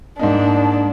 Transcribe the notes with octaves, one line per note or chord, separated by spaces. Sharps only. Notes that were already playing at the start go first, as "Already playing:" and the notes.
G#2 A#3 D4 D#4